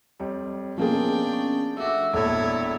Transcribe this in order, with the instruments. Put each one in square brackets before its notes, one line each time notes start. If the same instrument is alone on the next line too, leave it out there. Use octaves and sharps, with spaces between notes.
[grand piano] F2 G3 [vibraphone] C#5
[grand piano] B2 [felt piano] F3 A#3 G#4 [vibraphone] C#4 [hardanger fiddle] D4 G5
[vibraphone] C#4
[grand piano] A3 E5 [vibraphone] D4 E6 [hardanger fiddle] F#4
[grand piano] E1 A#1 [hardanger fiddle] E4 C#5 [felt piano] A4